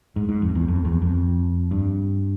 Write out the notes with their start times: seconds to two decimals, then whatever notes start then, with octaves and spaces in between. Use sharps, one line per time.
0.16 G#2
0.29 G#2
0.42 F2
0.55 E2
0.68 F2
0.85 E2
1.02 F2
1.71 G2